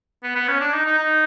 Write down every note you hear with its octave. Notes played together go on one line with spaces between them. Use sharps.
B3
B3
C#4
D4
D#4
D#4
D#4